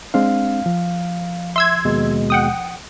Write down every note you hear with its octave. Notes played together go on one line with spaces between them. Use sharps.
G#3 C4 D4 F5
F3
E5 C6 E6 G#6
D#2 B2 G#3
F#5 G5 D#6